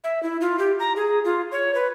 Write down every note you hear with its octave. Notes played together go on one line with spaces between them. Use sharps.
E5
E4
F4
G4
A#5
G#4
F4
C#5
B4